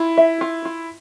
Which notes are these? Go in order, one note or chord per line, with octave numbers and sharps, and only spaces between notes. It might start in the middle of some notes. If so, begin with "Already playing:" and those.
Already playing: E4 F4
E5
F4
F4